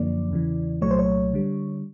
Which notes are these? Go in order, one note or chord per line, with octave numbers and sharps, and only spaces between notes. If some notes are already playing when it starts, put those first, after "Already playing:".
Already playing: F#2 D3 F3 A#3 D5
E2 C#3 E3
C2 A#2 F#3 A3 C#5
C5
C#5
D3 G3